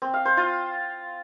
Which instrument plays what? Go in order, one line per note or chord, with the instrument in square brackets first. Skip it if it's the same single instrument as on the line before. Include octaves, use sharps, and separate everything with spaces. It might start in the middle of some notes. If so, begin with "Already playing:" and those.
[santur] C4
F5
C5
F4